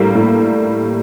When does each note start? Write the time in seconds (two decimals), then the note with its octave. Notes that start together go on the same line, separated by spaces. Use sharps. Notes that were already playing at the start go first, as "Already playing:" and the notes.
Already playing: A2 G3 A#3
0.15 A2